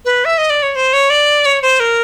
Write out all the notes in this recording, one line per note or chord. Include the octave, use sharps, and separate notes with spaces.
B4
E5
D#5
D5
C#5
C5
C#5
D5
C#5
C5
A#4